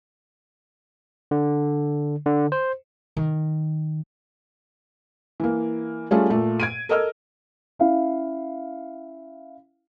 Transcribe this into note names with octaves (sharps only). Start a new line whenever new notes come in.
D3
D3
C5
D#3
E3 A#3
G3 A3 C#4 F4 G#4 A4
A#2 A3
G#6 D7 D#7
A4 A#4 D#5 E6 F6
C#4 E4 F5